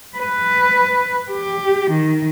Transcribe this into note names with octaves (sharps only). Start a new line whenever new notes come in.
B4
G4
D#3